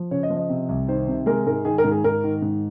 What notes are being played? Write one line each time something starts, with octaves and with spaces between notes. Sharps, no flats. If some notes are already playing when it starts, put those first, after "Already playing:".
Already playing: F3
C#3 C#5
D#5
F3
D#5
C3
C2
D#3 C5
C3
G#3 A#4
G#2 A#4
D#3 G#4
A#4
G#2
G#4
G#2 A#4
D#3
G#2